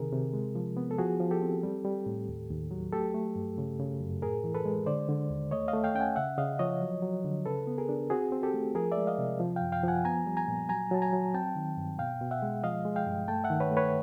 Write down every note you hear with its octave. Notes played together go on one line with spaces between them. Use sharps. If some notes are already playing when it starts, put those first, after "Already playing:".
Already playing: C3 D#3 G#4 A#4
C3
G#3
F3
B3
A4
F3 F#4 G#4
F3
G4 A4
C4
G3
G3
A2
D#2
D#2
F#3
A3 G4 A4
A3
G2
C#3
C#3
F#2
A2 G#4 A#4
E3
A4 B4
G#3
D3 C5 D5
D3
D#2
A3 C#5 D#5
D#5 F5
A3
F5 G5
C#4 G5
F#5 G#5
C#3 E5 F#5
C#3 D#5 F5
F3 C#5 D#5
F#3
F#3
D3
C#3 A4 B4
B3
G#4 A#4
D4
C4 F#4 G#4
C4
G4 A4
A3
F3 G#4 A#4
D5 E5
G#3
D#5 F5
C3
F3
F#2 F5 G5
F5 G5
F3 F#5 G#5
B3 G#5 A#5
G3
G#5 A#5
A#2
F#3 G#5 A#5
F#3 A5
G#5 A#5
F#3
C4 G5 A5
D#3
G2
B2 F5 G5
B2
E5 F#5
G#3
F3 D#5 F5
G#3
F5 G5
G2
A3 G5 A5
E5 F#5
D#3
B4 C#5
A3
B4 C#5